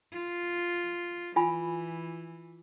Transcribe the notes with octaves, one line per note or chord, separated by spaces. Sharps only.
F4
E3 F4 G#5 B5